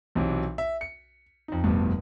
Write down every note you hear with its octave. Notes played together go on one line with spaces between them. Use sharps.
B1 C3 E3 F#3
E5
C#7
F2 D#4
F1 D2 G2 B2